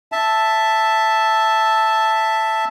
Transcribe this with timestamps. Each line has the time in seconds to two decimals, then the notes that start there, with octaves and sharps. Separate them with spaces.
0.12 E5 A5